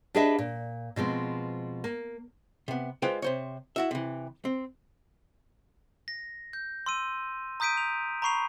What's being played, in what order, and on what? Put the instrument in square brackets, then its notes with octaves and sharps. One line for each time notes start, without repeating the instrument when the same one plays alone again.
[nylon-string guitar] D4 G4 G#4 B4 D#5 E5
A#2
B2 F3 G#3 C4
A#3
[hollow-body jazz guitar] C3 B3
G#3 F4 B4 C5 D5 G5
C3 C5 C#5
E4 F#4 E5
C3 E3
C4
[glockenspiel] A#6
G6
C6 E6 D#7
A#5 D#6 G6 B6 D7 D#7
F7
A#5 B5 C#6 C7 F7